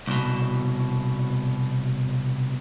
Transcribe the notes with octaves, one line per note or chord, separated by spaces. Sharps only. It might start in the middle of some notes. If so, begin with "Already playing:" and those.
C2 B2